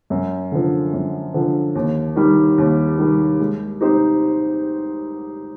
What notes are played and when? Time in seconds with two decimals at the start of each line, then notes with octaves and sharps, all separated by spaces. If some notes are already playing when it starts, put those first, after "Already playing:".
0.10 F#2
0.52 D3 F3
0.93 F#2
1.34 D3 F3
1.75 D#2
2.16 D#3 G3
2.58 D#2
2.98 D#3 G3
3.40 G#3
3.81 C4 D#4 G4 C5